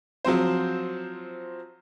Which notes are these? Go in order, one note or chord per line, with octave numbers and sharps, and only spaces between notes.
F3 F#3 C4 C5